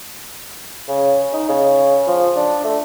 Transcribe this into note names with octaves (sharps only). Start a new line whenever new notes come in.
C#3
D#4
C#3
F3
D4
A3